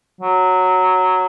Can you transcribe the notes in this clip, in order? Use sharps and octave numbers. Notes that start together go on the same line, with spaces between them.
F#3